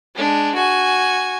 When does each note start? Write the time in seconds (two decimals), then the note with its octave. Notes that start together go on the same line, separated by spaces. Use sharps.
0.15 G#3 D4
0.55 F#4 G#5